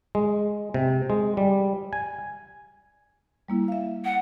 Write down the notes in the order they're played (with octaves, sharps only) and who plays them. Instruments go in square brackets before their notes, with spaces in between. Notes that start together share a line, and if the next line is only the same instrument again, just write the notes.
[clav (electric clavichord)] G#3
C3
G#3
G3
G#5
[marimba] G3 A#3 E4
E5 F5
[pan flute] F#5